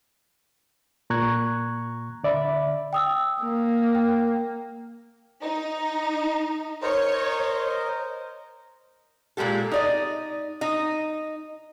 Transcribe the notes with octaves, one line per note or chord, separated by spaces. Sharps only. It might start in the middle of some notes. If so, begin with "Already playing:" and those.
A#2 A#5 C#6 F#6 G#6
D3 D5 E5 B5
G5 D#6 E6
A#3
G5
D#4
A#4 C5 C#5 D#5
A#2 G#3 A#3 G4 A4
D#4 D5 D#5
D#4 D#5